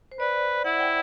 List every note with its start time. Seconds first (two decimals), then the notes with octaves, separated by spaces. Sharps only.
0.12 C5
0.20 B4 D5
0.64 E4 F#5
0.80 G5